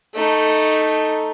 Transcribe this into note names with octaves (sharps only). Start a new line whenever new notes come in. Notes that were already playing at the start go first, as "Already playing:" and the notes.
A3 D#4